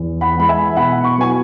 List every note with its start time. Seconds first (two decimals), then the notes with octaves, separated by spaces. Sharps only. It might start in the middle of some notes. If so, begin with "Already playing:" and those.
Already playing: E2
0.21 F#5 B5
0.35 E3 G#3 B5
0.49 E5 G#5
0.76 B2 F#5 B5
1.04 C#6
1.18 F#3 B3 E4 G#5 C#6